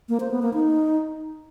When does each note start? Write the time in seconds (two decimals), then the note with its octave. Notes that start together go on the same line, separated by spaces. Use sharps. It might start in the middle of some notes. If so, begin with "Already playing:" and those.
0.09 A#3
0.20 C5
0.31 B3
0.42 A#3
0.54 D#4